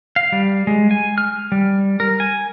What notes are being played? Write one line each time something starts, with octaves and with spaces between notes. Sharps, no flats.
F5
G3
G#3
G#5
F6
G3
A#4
G#5